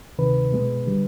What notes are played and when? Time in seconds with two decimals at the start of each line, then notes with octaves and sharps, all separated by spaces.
0.18 D2 C3 D#3 B4
0.52 B2 G#3 B3
0.86 D3 G3